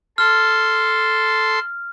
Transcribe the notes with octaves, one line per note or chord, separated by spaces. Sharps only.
A4 C6 F6